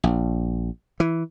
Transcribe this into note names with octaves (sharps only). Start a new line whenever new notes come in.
A#1
E3